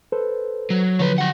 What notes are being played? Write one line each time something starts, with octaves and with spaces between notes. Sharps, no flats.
A4 B4 C5
F#3
D3 F3 F#3 B4 C#5
G4 F#5